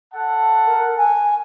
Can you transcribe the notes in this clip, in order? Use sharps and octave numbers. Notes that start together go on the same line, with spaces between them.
A4 F#5 A5
A#4
G#5